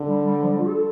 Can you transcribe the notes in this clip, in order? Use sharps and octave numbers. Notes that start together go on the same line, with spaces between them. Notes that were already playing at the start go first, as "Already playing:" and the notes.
Already playing: D3
G3
G3
F3
G3
F4
A4